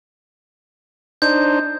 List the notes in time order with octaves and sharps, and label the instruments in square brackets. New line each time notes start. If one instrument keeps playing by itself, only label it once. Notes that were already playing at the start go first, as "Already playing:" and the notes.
[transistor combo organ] D4 D#4 C5 [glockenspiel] G6